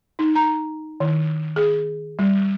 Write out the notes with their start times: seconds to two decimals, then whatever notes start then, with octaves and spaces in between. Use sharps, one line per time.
0.19 D#4
0.35 A#5
1.00 D#3
1.56 G#4
2.19 G3